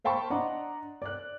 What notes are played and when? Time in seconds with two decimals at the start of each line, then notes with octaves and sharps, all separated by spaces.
0.04 C5 F5 G5 A5 B5 C#6
0.30 D4 D5 D#5 F#5 A#5 C6
1.02 D5 F#6